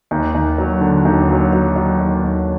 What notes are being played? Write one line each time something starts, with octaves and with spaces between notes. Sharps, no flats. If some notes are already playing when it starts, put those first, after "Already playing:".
D#2
D#2
F#3
D3
D#2
F#3
F#3
F#3
D#2
D#2